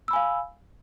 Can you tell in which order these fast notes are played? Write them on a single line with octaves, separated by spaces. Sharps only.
E6 B5 G#5 F5